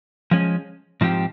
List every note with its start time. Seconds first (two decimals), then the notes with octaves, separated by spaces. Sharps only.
0.31 F3 G#3 C#4
1.01 G#2 F3 C4 G4